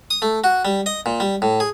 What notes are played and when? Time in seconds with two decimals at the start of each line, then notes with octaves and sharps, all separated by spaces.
0.11 D#6
0.22 A3
0.44 F#4
0.65 G3
0.86 D#5
1.06 A#2
1.20 G3
1.42 A2
1.60 G#4